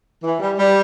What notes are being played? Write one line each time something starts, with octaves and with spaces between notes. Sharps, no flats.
E3
G3
G3